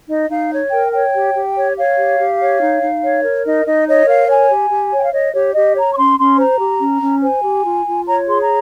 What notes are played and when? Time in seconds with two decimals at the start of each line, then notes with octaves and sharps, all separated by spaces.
0.08 D#4 D#5
0.30 D#4 F5
0.51 C#5
0.71 A#4 G5
0.93 C#5 G5
1.14 G4
1.34 G4
1.55 C#5
1.76 C#5 F5
1.98 G4
2.19 G4
2.40 C#5
2.61 D#4
2.82 D#4
3.02 C#5
3.24 A#4
3.45 D#4 D#5
3.65 D#4 D#5
3.86 C#5 D#5
4.07 A#4 F5
4.28 C#5 G#5
4.49 G4
4.70 G4
4.92 C#5 G5
5.04 F5
5.13 C#5 D#5
5.34 G4 C#5
5.54 G4 D#5
5.76 C#5 A#5
5.93 C#6
5.97 C#4 C6
6.18 C#4 C6
6.38 C5 A#5
6.59 G4
6.81 C#4
7.02 C#4
7.23 C5 G#5
7.43 G4
7.65 F4
7.86 F4
8.06 C#5 A#5
8.28 G#4 C6
8.39 A#5